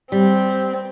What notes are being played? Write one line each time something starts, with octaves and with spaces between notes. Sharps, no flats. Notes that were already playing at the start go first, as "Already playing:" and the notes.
G3 C4